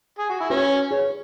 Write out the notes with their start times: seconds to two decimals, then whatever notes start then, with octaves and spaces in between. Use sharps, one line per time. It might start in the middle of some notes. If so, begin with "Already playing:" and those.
0.18 G#4
0.29 F#4
0.40 E4
0.50 C#4 F#4 B4
0.91 G#4 C#5